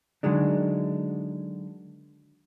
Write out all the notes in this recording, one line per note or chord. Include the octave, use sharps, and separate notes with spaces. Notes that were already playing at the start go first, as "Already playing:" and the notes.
D3 D#3 F#3 G#3 D4